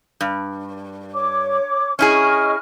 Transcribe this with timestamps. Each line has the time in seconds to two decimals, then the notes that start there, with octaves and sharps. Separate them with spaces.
0.21 G2
1.15 C#5 D6
1.99 C#4 E4 G#4 D#5 C#6 F6